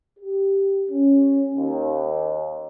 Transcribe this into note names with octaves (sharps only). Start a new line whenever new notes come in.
G4
C#4
D#2